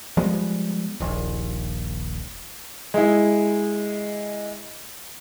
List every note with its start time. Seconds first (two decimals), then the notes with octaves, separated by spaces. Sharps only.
0.17 F3 G3 G#3 B3
1.00 D#1 A#1
2.94 G#3 E4